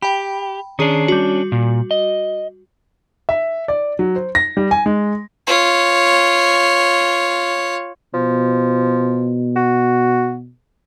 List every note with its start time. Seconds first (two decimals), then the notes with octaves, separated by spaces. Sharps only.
0.02 G4 G5 B5
0.79 D#3 C#4 D4 G#4 C7
1.08 G3 F#4
1.52 A#2
1.91 D#5
3.29 E5
3.68 D5
3.99 F#3
4.16 C5
4.35 A#6
4.57 G3
4.71 G#5
4.86 G#3
5.47 F4 C#5
8.14 B2 F3
9.56 F#4